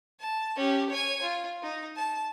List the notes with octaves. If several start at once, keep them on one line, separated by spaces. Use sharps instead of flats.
A5
C#4 G4
C#5 G#5
F4
D#4
A5